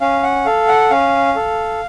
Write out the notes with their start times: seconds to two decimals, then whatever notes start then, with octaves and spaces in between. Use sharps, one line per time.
0.01 C#4 F5
0.23 F#5
0.46 A4 F5
0.68 F#5
0.90 C#4 F5
1.36 A4